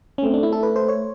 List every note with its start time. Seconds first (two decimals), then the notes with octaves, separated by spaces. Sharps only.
0.18 C#4
0.23 A3 C4
0.34 D4
0.43 E4
0.52 A4
0.63 B4
0.76 C5
0.88 C#5